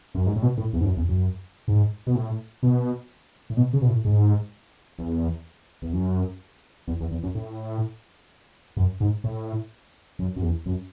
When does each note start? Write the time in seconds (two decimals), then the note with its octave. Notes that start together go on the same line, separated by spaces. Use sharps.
0.15 F#2
0.27 G#2
0.36 A2
0.42 B2
0.58 A2
0.73 E2
0.81 G#2
0.85 F#2
0.97 E2
1.09 F#2
1.68 G#2
2.07 B2
2.15 A2
2.63 B2
3.50 A2
3.57 B2
3.73 C#3
3.81 B2
3.88 A2
4.05 G#2
4.99 E2
5.82 E2
5.93 F#2
6.88 E2
7.00 E2
7.11 E2
7.23 F#2
7.35 A2
8.77 F#2
9.00 G#2
9.24 A2
10.19 F#2
10.36 F#2
10.42 E2
10.66 F#2